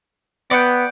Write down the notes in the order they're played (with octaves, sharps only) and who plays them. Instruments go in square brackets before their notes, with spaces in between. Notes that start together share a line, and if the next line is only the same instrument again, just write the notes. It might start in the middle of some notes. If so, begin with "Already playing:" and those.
[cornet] B3 [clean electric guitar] D5 F#5 G5